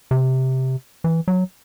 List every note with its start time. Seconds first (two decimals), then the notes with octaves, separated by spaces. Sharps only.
0.11 C3
1.04 E3
1.28 F#3